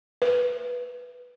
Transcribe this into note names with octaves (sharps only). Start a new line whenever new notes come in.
B4